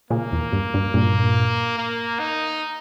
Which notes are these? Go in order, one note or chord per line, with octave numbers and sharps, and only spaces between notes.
A#2 C#3 A#3
E2
G2
G2
G2 A#2
A#3
D#4